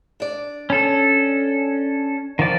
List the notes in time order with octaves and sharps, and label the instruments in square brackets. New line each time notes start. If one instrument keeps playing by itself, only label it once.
[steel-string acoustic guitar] D4 D5
[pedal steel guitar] C#4 A4
D#3 F3 D5